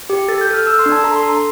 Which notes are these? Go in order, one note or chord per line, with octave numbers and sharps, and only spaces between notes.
G4
A4 A6
G6
A4
F6
A4 E6
C6
D4
A5
A4 A#5
C6
A4
A#5